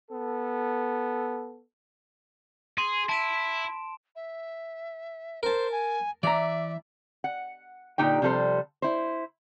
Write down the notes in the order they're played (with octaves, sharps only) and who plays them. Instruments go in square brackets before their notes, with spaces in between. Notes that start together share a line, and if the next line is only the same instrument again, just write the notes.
[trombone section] B3 A4
[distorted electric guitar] G#4 [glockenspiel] C6
[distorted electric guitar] E4 [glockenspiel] A5 D7 E7
[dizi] E5
[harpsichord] A#4 A5 [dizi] C5
[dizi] G#5
[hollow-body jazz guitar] E3 A#5 [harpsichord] D5 [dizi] E5
[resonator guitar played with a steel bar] F#5
A#2 D3 D#4 G4 G5
C3 F3 G3 A4 C5
E4 C5